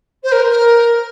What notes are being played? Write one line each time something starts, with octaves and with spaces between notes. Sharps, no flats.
C5
A#4
A#4